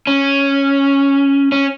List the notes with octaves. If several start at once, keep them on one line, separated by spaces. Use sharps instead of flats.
C#4
C#4